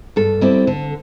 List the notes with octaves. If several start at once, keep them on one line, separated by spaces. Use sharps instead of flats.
G2 A4
G3 C4 E4
D3